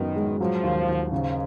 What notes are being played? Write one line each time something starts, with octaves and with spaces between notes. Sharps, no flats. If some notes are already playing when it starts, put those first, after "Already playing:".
Already playing: F#2 D#3 B3
G#3
F3 F#3
D#2
D#2
G#2 C#3